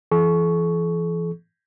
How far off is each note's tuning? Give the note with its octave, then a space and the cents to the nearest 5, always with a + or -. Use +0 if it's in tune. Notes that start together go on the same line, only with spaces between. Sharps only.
E3 +30 A4 -45 C#6 +5